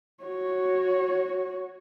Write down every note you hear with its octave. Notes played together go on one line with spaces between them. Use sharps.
F#4 C#5